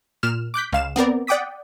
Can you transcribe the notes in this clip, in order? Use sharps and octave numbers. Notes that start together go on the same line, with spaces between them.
A#2 F6 E7
D6 F#6 G6 B6
C#2 F5 E7
B3 C4 A#4 D5
D5 F#5 G5 D6 D#6 B6